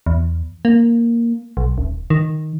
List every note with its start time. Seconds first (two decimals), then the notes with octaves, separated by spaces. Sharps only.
0.06 E2
0.65 A#3
1.57 B1
1.78 D#1
2.10 D#3